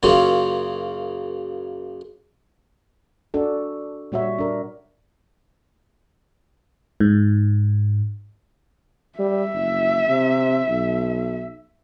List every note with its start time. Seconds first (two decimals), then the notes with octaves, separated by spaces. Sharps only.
0.03 F#2 C#3 A#3 C#4 F4
3.34 D4 F#4 A4
4.12 A#2 G3 F#4 C#5 E5
4.39 D4 A#4
7.00 G#2
9.19 G3 E5
9.54 F#1
10.09 C3
10.69 B1